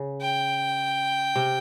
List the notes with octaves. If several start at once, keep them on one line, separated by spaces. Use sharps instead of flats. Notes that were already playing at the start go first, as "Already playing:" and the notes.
Already playing: C#3
G5
C3